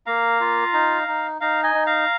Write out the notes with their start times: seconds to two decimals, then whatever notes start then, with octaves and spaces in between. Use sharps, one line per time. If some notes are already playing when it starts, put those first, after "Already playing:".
0.06 A#3 F5 A#5
0.40 F4
0.73 D#4
1.08 D#4
1.40 D#4 F5 A#5
1.63 D#5 G#5
1.75 D#4
1.86 F5 A#5